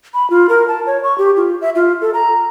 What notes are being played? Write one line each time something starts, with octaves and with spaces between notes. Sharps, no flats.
B5
F4
A#4
A5
C#5
C#6
G4
F4
E5
F4
A4
A#5